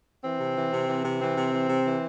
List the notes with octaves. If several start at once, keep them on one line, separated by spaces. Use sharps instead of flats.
E3 C4
C3
E3
C3
E3
C3
E3 C4
C3
E3
C3
E3